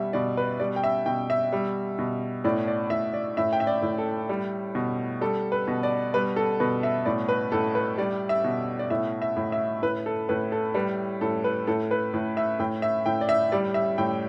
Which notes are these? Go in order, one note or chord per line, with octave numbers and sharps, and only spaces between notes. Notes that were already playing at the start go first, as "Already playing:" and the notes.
Already playing: B2 G3 E5
B2 D5
B4
G3 D5
G5
E5
B2 G5
E5
G3
B2
A2 D5
D5
A2 E5
D5
A2 E5
G5
E5
D5
A2
A4
G3
B2
G3 A4
B4
B2
D5
G3 B4
A4
B2 B4
E5
A2 D5
B4
A2 A4
B4
G3 D5
E5
B2
D5
A2 E5
E5
A2
E5
A2 B4
A4
A2 B4
A4
G3 B4
A2 A4
B4
A2 A4
B4
A2
E5
A2 G5
E5
A2 G5
D5
E5
G3 D5
E5
A2 G5